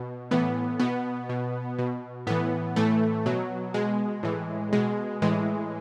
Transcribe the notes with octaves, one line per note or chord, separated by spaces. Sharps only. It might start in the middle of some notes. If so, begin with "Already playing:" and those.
Already playing: B2
A2 E3 B3
B2 B3
B2
B2
A2 E3 B3
A2 E3 A3
B2 F#3
B2 G#3
A2 E3
B2 G#3
A2 E3 G#3